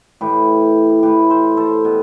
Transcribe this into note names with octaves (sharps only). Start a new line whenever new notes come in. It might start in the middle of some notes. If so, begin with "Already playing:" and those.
A2 E3 G4 B4
A2 E3 G4 B4
A4 C5
A4 C5
B2